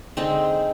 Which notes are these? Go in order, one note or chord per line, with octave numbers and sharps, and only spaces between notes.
D3 G#3 C4 D#4